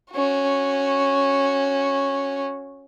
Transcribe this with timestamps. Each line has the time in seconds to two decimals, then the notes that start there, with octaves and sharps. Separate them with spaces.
0.12 C#4 F#4